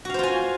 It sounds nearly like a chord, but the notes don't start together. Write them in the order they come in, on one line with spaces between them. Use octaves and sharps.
F#4 F5 C5 F4 G#5